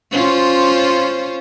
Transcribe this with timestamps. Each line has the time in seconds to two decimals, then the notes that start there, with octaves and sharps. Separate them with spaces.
0.12 C#4 F4 C5